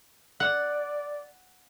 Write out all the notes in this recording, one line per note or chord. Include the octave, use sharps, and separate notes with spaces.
D5 F#5